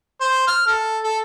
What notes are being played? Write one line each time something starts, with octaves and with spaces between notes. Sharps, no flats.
C5
F6
A4
A4